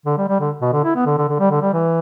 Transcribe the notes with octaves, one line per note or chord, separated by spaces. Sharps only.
D3
G3
G3
D3
B2
D3
E4
B3
D3
D3
D3
G3
D3
G3
E3